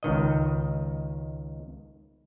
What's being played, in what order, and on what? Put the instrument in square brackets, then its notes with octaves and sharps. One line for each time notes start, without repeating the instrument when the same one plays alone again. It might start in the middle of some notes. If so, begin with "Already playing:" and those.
[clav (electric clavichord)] C#2 D#3 D#5